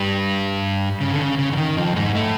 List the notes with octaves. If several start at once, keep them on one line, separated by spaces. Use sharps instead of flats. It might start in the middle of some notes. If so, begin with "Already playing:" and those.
Already playing: G2 G3
C#3
D3
C#3
C#3
D3
D#3
F2 F3
G#2 G#3
A2 A3